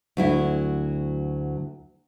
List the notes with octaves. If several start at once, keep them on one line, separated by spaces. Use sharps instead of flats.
D2 F#3 E4